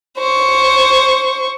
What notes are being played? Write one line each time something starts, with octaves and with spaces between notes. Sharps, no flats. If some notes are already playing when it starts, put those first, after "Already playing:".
C5 C#6